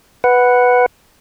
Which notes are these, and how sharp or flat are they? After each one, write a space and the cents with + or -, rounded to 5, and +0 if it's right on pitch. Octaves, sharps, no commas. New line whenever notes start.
B4 +0 F#5 +0